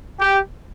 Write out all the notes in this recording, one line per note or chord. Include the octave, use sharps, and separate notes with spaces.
G4